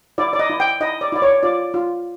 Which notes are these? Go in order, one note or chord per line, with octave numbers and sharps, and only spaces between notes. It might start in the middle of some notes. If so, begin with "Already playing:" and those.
E4 D5
D5
D#5
E4
G5
E4 D#5
D5
E4 D5
C#5
F4 D5
F4